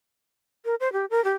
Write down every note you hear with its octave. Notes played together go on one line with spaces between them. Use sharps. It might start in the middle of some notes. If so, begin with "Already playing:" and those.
A#4
C5
G4
A#4
G4